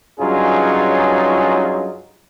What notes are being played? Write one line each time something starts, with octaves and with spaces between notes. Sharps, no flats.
G2 F#3 C#4 D#4 F4 G#4